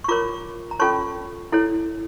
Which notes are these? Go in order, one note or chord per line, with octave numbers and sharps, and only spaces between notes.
C#6
F4 A#4 C#5 A#5 D6
A#5
C#4 F4 A4 C#5 A5 C#6
E4 A4 C#5